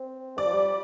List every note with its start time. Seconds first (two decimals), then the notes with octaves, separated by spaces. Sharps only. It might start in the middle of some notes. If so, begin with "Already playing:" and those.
Already playing: C4
0.38 G3 D5
0.46 F3
0.54 G3